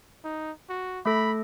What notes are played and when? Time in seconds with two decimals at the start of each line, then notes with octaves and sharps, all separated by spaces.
0.24 D#4
0.69 F#4
1.05 A3 A4 B5 A#6